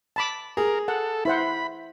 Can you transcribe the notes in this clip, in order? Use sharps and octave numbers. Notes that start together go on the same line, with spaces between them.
A5 B5 D6
G#4 A#4
A4 F#5
E4 C5 F#5 B5